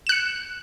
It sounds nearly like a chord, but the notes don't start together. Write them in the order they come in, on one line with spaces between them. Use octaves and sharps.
E7 F#6 C#7